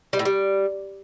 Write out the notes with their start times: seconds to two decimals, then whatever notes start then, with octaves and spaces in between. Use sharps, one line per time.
0.13 G3
0.19 A2
0.25 G3